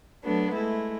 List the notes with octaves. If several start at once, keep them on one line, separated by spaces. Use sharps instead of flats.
F#3 A3 B3 D4
G#3 A3 E4